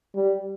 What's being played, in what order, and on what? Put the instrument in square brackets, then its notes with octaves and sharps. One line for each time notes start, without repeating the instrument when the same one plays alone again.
[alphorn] G3